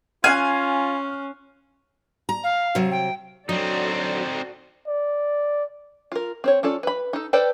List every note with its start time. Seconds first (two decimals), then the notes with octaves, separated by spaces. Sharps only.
0.24 C#4 F4 G#5 F6 F#6 C7
2.29 A#5
2.44 F5
2.75 C3 F#3
2.91 G5
3.49 F#3 C4 D4 D#4 F#4 A4 D5
4.87 D5
6.12 F4 A#4
6.44 C4 C5 C#5
6.63 C#4 F4 A4 D5
6.83 B4 B5
7.13 D#4 A4
7.33 A4 B4 C5 D5 G5